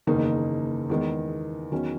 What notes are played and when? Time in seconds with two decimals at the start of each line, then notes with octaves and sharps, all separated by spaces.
0.07 F#1 E2 D#3 A#3 D#4
0.90 E2 D#3 G#3
1.72 E2 D#3 F#3 C#4